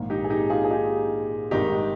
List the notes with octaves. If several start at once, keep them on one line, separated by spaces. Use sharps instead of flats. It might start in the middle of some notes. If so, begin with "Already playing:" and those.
Already playing: A#1 G#2 D#3 A#3
D#4 G4
G#4
D#4 G4
F4 G#4
G#4
D#4 G4
G#1 G#2 D#3 G3 D#4 G4